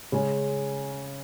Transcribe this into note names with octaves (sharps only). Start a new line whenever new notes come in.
C#3 G#3 C#4